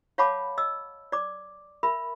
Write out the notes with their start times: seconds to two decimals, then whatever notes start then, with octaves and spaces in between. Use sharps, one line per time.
0.18 C#5 F5 F#5 A5 B5 D6
0.58 D#5 E6
1.12 D5 D6
1.83 A#4 E5 B5